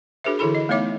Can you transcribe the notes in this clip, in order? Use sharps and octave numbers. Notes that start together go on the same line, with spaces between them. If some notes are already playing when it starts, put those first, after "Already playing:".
D4 F#4 G#4 A#4 C5 E5
D3 E3 E4 G#4 A4 B5
D#5
A3 B3 D#4 C#5 E5 D6